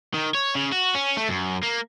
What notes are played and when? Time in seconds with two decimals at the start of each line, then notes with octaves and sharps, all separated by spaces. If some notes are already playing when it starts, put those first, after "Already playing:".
0.14 D#3
0.35 C#5
0.55 C#3
0.72 F#4
0.95 C#4
1.17 A3
1.29 F#2
1.63 A#3